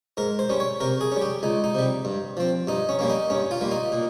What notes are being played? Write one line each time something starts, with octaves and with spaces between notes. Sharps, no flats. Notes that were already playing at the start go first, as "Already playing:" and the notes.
G#2 A#4
C5
G3 C#4
C#5
C3 A#4
G#4
G3 C#4
G4
C#2 D#4
D#4
C3 G3
G2
F3 C4
G2 D#4
C#4
G3 A#3 C#4
D#4
G2 C#4
F4
G3 A#3
D#4
A#2